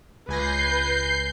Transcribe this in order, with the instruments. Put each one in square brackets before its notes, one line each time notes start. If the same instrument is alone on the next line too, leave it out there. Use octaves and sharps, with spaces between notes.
[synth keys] C#2 G#5 A#6 [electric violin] B4 [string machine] G6 C7